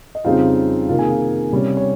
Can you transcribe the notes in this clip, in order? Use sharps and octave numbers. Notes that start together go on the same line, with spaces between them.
D#5
F2 C#3 G3 C4 D#4 F4 F5
C3 D#3 A#3 D#4 F4 F5
G#4 G#5
F4 F5
C3 G3 C#4
C#5